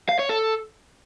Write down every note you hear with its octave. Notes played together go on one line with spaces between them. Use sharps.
F5
C#5
A4